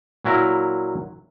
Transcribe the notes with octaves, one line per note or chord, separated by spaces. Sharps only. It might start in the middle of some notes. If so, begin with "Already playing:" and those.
A#2 F#3 E4 A#4